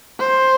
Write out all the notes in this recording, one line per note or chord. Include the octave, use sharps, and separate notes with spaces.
C5